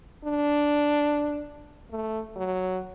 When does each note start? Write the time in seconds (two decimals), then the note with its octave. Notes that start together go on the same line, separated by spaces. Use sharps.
0.25 D4
1.92 A3
2.36 F#3